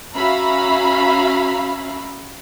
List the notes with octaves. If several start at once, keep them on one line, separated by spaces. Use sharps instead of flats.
C#4 F#4 E5 F5 A#5 B5